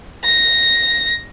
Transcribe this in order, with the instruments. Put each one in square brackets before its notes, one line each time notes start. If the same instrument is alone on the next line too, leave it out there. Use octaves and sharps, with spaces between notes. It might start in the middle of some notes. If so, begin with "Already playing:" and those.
[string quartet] A#6